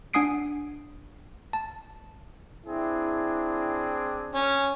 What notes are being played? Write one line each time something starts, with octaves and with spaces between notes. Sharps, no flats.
D4 F#5 G#5 D#6 C7 D7
A5
C4 D4 E4 G#4
C#4